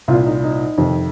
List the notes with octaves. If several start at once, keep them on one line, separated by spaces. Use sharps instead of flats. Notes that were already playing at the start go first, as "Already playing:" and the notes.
C2 A#2 F4
D#4
D#4
F2 C3 D#3